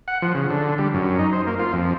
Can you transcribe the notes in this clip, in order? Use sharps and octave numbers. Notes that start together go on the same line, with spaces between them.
F#5
F3
C#3
D3
G3
F#2
D#4
C5
A#3
F4
F2